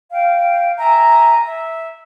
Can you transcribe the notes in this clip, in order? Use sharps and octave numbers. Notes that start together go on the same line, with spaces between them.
F5 G5
E5 G#5 A#5
E5